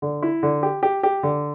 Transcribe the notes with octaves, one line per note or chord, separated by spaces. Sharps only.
D3
E4
D3
G4
G4
G4
D3